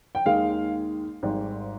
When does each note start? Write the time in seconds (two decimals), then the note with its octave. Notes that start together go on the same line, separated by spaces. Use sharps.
0.15 G5
0.25 D#2 D#3 G#3 F5
1.23 G#1 G#2 G3